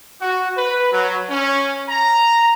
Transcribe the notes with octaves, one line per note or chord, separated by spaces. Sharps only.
F#4
B4
F#3
C#4
A#5